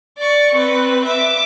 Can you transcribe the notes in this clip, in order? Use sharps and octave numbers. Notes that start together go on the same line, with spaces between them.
D5 C#6
C4 B4
E5 D6